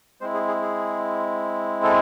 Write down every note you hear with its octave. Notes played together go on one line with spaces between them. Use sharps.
G#3 C4 E4 C5
G#4
G#4
G#4
A4